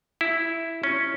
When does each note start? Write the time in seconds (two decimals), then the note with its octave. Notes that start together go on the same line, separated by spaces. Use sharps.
0.21 E4
0.83 C#4